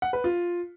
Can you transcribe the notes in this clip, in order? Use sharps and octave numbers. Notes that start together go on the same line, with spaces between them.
F#5
B4
F4